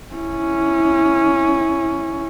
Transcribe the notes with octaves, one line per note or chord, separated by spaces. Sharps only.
C#4 E4